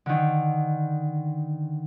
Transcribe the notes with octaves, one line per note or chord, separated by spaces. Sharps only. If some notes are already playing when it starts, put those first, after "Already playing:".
D3 D#3